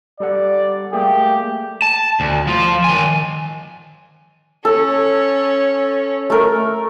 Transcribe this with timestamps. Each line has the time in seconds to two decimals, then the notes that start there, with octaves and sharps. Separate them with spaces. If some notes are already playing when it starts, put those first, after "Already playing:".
0.20 G3 A4 D5 F#5
0.93 A3 A#3 G4 G#4
1.82 A5
2.20 D2
2.47 F3 F4
2.84 D#3 G#5
4.65 C#4 A4
6.30 A3 A4 A#4